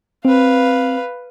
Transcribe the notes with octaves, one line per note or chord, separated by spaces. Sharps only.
C4 B4 F5